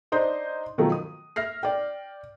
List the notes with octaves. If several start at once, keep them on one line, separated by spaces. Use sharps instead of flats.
D4 D#4 C5 D#5
B2 D#3 F3 F#3 A3
D#6
E5 F6 A#6 C7
D5 G5